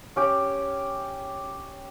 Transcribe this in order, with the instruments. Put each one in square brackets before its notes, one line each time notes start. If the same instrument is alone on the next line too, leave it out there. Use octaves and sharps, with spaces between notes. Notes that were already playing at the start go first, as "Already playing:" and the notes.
[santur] C#4 G4 G5